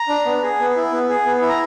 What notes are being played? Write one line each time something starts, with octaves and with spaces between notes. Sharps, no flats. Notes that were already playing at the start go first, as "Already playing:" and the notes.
Already playing: A#5
D4
B3
G#4
B3
E4
B3
G#4
B3
E4
A#5